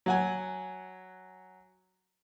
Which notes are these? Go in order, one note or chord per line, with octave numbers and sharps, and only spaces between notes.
F#3 F#5 G#5